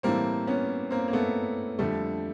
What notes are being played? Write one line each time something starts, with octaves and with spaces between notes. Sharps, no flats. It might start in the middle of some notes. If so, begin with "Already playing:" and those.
A2 E3 G3 A#3 C4
B3 C#4
A#3 C4
A#3
A3 B3
F2 D3 G3 A3